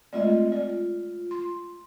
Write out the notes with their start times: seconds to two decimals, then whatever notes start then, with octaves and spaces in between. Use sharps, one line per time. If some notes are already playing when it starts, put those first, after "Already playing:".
0.13 G#3 A3 C4 F4 D5 D#5
0.52 F4 D5
1.31 C6